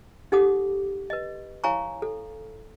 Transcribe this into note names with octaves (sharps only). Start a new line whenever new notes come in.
D#4 G4 A4 F#5 D6 D#6
B4 D#5
E4 C#5 F5 G#5 A#5 C#6
A4